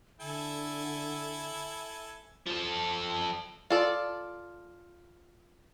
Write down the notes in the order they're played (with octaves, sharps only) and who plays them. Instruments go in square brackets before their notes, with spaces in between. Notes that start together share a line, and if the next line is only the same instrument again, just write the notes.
[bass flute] D3 [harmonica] E4 A4 G#5
[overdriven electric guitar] F3 A4
[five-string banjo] F4 A4 D5